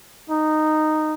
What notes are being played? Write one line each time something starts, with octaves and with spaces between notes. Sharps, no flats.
D#4